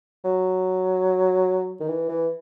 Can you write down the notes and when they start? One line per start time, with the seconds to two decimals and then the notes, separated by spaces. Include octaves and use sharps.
0.24 F#3
1.80 D#3
1.88 E3
2.09 E3